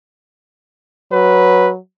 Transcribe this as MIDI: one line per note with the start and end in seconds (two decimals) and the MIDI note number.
1.12 1.77 54
1.12 1.71 71